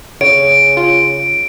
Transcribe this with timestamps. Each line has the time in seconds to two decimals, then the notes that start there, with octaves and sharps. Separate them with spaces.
0.21 C#3 C#5 D7
0.77 F4